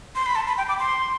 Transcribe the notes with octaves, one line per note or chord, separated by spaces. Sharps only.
C6
B5
A5
B5
G5
D6
C6